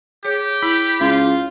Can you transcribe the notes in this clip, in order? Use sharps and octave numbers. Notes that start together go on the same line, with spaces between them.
G4 G#4 C#5
E4 B5
C#2 F4